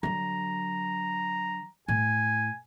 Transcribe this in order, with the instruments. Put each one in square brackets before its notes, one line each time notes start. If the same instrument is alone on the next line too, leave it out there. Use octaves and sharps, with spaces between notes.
[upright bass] D3 F#3 [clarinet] A#5
[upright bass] A2 [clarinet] G#5